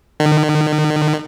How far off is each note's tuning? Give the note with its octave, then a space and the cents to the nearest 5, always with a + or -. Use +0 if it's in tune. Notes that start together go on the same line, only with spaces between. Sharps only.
D#3 -40